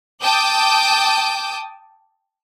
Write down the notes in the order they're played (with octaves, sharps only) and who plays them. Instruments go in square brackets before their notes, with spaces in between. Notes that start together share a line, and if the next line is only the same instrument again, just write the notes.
[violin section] G5 A5 D6 D#6 G6